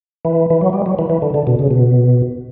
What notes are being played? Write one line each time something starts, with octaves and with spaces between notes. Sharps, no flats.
E3
E3
F#3
G3
F#3
E3
E3
D3
D3
B2
C#3
B2